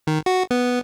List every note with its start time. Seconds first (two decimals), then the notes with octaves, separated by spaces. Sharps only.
0.07 D#3
0.26 F#4
0.51 B3